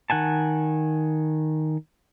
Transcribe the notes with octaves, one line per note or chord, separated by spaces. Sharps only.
D#3 F#5 G#5 A5